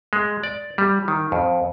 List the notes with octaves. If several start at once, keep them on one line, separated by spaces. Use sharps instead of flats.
G#3
D5
G3
D#3
F2